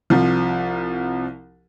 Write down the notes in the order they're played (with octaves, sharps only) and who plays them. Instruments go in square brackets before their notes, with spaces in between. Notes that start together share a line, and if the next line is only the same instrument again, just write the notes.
[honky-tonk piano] C2 F3